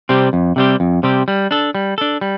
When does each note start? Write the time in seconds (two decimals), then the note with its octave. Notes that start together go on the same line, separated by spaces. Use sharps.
0.09 C3 G3 C4 G4
0.33 F2
0.56 C3 G3 C4 G4
0.80 F2
1.03 C3 G3 C4 G4
1.28 G3
1.51 D4 A4
1.75 G3
1.98 D4 A4
2.21 G3